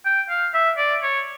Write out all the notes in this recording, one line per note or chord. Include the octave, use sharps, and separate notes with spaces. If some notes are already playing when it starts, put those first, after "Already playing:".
G5
F5
E5
D5
C#5